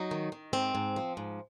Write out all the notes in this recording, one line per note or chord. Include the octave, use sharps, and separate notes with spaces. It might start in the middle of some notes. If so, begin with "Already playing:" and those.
Already playing: F#3 D#4
D#3
D#3
G#2 C4
G#2
F3
G#2